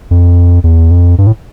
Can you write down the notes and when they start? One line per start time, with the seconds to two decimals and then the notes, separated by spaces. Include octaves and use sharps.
0.11 F2
0.64 E2
0.91 F2
1.18 G2
1.27 A2